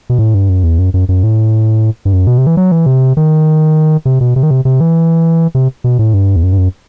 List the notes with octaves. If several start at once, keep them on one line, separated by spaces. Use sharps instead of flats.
B2
A2
G2
F#2
E2
F#2
F#2
F#2
A2
G2
F#2
B2
C3
E3
F#3
E3
C3
D#3
C3
B2
C3
D#3
C3
C3
E3
C3
B2
A2
G2
E2
F#2
G2
F#2